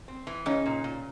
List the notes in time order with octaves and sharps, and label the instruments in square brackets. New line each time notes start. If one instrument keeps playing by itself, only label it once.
[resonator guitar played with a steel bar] C4
E3
[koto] C#3 C#4 [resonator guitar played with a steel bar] D#4
[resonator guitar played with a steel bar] A#2
A#2